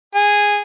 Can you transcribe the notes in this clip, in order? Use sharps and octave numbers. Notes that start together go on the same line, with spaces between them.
G#4